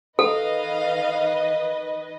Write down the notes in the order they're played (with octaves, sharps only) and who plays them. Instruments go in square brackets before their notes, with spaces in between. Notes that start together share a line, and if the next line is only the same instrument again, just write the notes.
[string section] D#3 B4 D#5 [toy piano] A4 [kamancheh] F5